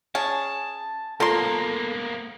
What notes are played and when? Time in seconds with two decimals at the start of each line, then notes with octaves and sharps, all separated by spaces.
0.15 C#4 G#4 A5
1.20 F3 A#3 B3 A4 A#5 C6